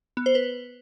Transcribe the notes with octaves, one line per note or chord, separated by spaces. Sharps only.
B3
C5
B4